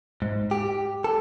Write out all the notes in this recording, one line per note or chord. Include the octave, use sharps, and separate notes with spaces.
G#2
G4
A4